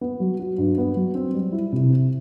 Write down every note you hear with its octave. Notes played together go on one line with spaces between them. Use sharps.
B3
F#3
F#4
G2
B3
F#3
C4
G3
E4
C3
C4